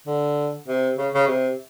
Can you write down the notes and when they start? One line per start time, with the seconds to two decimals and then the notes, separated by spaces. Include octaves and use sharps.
0.07 D3
0.68 C3
0.98 C#3
1.14 C#3
1.28 C3